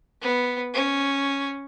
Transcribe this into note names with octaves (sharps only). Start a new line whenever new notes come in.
B3
C#4